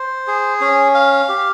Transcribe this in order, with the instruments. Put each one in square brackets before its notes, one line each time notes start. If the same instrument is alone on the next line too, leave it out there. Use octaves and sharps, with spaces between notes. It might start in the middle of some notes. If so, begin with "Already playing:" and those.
Already playing: [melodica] C5
G#4
C#4
F5
G4